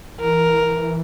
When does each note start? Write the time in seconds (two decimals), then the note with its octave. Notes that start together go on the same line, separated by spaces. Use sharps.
0.20 E3 A#4